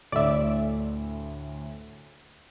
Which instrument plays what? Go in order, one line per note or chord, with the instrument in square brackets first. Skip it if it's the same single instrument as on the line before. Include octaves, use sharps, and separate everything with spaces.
[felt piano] D2 A2 [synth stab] D5 E5